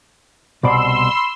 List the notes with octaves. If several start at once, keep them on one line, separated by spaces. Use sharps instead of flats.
C2 B2 D5 B5 C6 E6